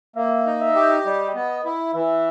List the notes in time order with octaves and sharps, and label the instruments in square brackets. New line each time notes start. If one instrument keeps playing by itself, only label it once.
[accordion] A#3 [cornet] E5
[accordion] D#4
[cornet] E5
[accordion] G4
[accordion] G3 [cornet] D#5
[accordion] B3
E4
[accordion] E3 [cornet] E5